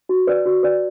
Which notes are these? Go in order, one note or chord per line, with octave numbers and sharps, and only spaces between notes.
F#4
B4 D5
F#4
B4 D5